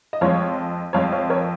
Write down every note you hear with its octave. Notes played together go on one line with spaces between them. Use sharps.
D#5
F2 F3 G#3 C#5 F5
F2 F3 G#3 C#5 F5
C#5 F5
A#4 C#5